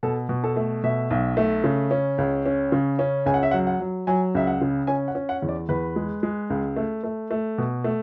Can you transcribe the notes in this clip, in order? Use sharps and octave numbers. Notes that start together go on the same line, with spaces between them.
B2 A4
B2
A4
A3
B2 E5
B1
A3
C#3
C#4
C#2
C#4
C#3
C#4
C#2 G#5
F#5
E5
F#3 F#5
F#5
F#3
F#3 G#5
C#2 E5
F#5
C#3
C#4 G#5
F#5
C#4
F#5
E2
D5
E2 B4
G#3
G#3
C#2
A3
A3
A3
B2
A3